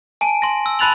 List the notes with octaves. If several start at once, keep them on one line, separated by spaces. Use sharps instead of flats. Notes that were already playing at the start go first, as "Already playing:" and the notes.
G#5 A5 D7
C6 A#6
E6
A5 B5 F#6 A6 F7 F#7